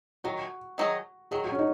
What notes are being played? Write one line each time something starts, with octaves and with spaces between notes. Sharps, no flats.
D#3 F#3 F#4
D#3 F#3 D#4 G#4 D#5
D#3 F#3 G#4
F#4
C#4
D#4